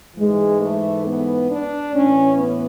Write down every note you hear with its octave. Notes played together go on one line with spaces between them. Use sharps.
G#2 E3 G#3
A3
B3
D4
A2 E3 C#4
B3